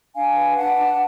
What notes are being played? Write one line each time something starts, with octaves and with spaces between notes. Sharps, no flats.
D4 F5 G#5
B4
D4 F#5 A5
D4